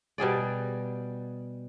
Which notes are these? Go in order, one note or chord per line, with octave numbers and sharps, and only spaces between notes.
B2 G3 G#4 D5